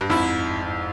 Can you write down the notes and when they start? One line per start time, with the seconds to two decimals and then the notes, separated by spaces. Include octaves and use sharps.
0.01 G2
0.10 F2 G#2 E4